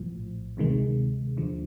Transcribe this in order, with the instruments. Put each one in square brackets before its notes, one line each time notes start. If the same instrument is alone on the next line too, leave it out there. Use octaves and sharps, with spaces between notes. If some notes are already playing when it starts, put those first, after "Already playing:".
Already playing: [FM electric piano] A#1 A2 F3
D2 C3 D#3 G#3
D#2 D3 F3